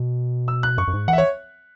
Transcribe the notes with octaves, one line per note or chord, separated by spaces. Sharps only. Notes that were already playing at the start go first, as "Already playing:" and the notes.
Already playing: B2
E6
F#6
F#2 C#6
F#2
G#2
E3 F#5
E5
C#5